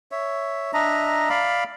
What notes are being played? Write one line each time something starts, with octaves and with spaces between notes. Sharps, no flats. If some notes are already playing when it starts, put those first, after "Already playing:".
C#5 E5
D4 D#5 E5 A#5
D5 F5 B5